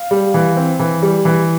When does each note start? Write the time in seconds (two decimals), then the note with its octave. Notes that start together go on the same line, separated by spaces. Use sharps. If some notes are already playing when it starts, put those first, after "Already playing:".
Already playing: F5
0.11 G3
0.34 E3
0.56 C4
0.80 E3
1.02 G3
1.25 E3